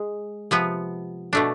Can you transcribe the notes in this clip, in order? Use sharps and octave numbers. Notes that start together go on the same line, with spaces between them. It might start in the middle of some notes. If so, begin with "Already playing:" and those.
Already playing: G#3
C3 F3 B3
B2 A3 D4